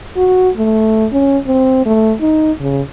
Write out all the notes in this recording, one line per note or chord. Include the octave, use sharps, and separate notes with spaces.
F#4
A3
C#4
C4
A3
D#4
C#3